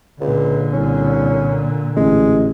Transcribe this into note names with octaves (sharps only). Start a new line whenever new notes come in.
C#2 A#2 D3
C2 C#4
A1 G#3